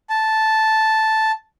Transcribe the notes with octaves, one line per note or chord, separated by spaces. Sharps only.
A5